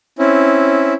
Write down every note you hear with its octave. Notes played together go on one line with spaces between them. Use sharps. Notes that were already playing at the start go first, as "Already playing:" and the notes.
C4 C#4 E4